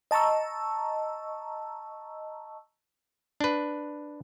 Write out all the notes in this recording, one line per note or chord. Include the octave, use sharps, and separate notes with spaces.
D#5 A5 A#5 C#6 E6
D4 B4